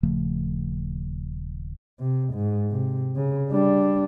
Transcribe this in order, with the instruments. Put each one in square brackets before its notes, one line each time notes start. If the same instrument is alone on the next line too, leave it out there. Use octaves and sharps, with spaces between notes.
[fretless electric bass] D#1 C#3 F3 A3
[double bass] C3
G#2
C3
C#3
G3 D4